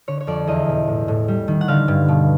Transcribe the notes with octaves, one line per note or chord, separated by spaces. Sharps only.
D3 C#5
C#5
F2 D5
E2 D#5
B2
A2
A2
G3
D#3
F#5
D3 F5
G2
B2